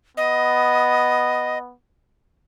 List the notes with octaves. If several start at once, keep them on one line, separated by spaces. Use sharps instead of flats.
B3 D#5